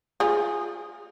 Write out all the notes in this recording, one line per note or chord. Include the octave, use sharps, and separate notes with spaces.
F4 G#4